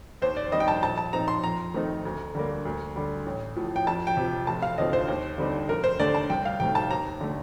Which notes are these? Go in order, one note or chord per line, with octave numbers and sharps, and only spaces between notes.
D#2 C5
D5
D#3 G3 C4 D#5
G5
A5
A#1 A5
A5
A#2 F3 C4 D#4 A#5
C6
F2 A#5
D#3 A3 C4 D#4
D2
D3 G3 A#3
D2
D3 G3
A1
A2 F3
G5
F2 A5
G5
C3 F3
F1 A5
F5
D#2 D3 F3 C4 D#5
C5
D#2
D3 G3 C4 D#4
F1 A#4
C5
D#2 D3 A3 D4 D5
A5
C2 G5
F5
C3 D#3 A3 G5
A5
D#2 A#5
D3 A3